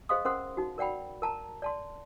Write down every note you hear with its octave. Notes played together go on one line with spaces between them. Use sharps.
G#4 C5 D#5 F5 C6 D#6
C#4 A#4 C5 F#5 C6 D#6
D#4 F#4
A#4 D5 F#5 G5 B5
A#4 A5 A#5
D5 A5 C6